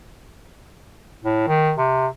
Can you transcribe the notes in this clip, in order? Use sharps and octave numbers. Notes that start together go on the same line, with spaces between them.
A2
D#3
C3